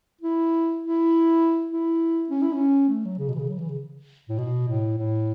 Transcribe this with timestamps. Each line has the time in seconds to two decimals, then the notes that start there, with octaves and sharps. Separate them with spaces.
0.21 E4
0.81 E4
1.70 E4
2.30 C#4
2.42 E4
2.53 C#4
2.89 A3
3.05 F#3
3.18 C#3
3.28 B2
3.35 E3
3.39 C#3
3.49 F#3
3.58 E3
3.68 C#3
4.29 A2
4.38 B2
4.68 A2
4.97 A2